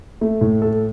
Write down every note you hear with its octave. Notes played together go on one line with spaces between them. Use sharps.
A3
A2
A4